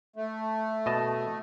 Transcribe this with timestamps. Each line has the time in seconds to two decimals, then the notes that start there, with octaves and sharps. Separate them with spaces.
0.16 A3
0.86 B2 D#5 A5